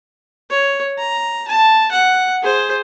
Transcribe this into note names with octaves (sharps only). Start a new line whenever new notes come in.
C#5
A#5
A5
F#5
G#4 C5